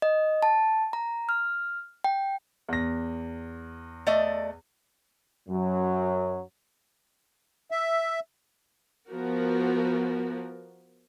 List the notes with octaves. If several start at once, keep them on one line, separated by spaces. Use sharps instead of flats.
D#5
A5
A#5
F6
G5
E2 A#6
A3 D5 D#5
F#2 F#3
E5
F3 B3 F#4 A#4